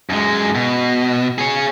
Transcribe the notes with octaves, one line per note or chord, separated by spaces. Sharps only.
F#2 G#3
B2
G#4 C#5